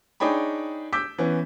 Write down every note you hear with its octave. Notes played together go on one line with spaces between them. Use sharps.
D4 D#4 G#4 C#5 G5 B5
D6 E6 G6 B6
E3 B3 C#4